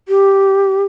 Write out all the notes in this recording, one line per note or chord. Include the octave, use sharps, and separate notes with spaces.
G4